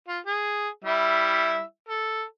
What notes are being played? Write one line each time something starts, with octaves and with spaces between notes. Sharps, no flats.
F4
G#4
G3 E4 E5
A4